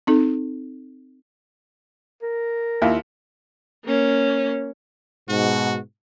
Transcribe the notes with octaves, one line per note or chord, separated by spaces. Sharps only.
C4 D#4 A4
A#4
D#2 E4 F4
A#3 C#4
G#2 B2 F#4